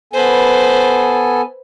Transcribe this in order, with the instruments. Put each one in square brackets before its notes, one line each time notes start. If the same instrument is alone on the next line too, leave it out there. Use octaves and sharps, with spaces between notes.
[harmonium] B3 A4 G#5 [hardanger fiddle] B4 C5